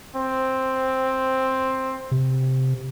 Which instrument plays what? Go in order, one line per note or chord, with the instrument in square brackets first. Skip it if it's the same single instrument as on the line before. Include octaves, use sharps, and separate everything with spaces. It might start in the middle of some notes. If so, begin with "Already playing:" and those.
[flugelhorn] C4
[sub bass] C3